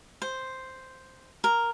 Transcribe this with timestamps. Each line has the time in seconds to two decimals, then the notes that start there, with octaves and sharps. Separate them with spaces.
0.22 C5
1.44 A#4